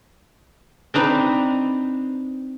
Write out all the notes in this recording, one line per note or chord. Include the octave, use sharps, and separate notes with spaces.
C4 D4 D#4 B4